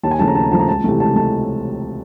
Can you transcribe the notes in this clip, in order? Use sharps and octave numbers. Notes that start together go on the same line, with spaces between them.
D#2 A5
G#5
C#3 F3 A3 A5
A#5
D#2 A5
A#5
C#3 F3 A3 A5
A#5
C#2 A5
C3 E3 A3
C#2 A5
A3 A5